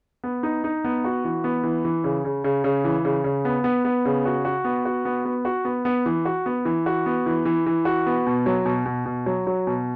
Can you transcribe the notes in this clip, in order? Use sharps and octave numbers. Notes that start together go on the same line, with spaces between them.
B3
D#4
D#4
B3
F#4
E3
B3
E3
E3
C#3
C#3
C#3
C#3
E3
C#3
C#3
B3
B3
B3
C#3
F#4
F#4
B3
F#4
B3
B3
F#4
B3
B3
E3
F#4
B3
E3
F#4
B3
E3
E3
E3
F#4
B3
B2
F#3
B2
B2
B2
F#3
F#3
B2